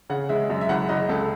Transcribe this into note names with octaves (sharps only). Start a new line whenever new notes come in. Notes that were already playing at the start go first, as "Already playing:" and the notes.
C#3 F#5
G#3 E5
F#2
E5
F#1 F#5
F#1 D#5
C#2 A4